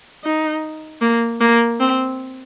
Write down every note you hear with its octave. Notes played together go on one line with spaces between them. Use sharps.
D#4
A#3
A#3
C4